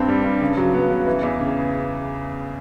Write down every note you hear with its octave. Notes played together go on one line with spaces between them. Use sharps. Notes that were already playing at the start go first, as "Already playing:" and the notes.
Already playing: G2 C4
G3
G2
C#3
F#3
B3
C#3
E3
E2
C#3